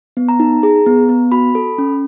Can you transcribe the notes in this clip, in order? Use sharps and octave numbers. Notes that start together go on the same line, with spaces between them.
B3
A#5
D#4
G#4
B3
B3
F#4 B5
A4
C#4